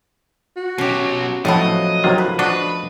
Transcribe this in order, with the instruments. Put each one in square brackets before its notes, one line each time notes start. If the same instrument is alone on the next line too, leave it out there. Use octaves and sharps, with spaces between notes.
[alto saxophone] F#4
[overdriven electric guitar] B2 F#3 [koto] C#4 G4
[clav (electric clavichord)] A2 [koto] F3 A3 B3 [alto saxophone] F#3 [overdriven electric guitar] D#5
[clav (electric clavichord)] C3 D#3 F4 [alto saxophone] F#3
[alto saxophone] F3 [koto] B4
[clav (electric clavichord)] D4 F#4 [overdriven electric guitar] B4 [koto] D#5